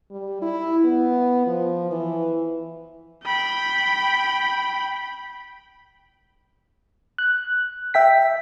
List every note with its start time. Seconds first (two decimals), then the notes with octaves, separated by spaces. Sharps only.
0.11 G3
0.42 E4
0.84 B3
1.46 F3
1.91 E3
3.26 G5 B5
7.18 F#6
7.94 E5 G5 B6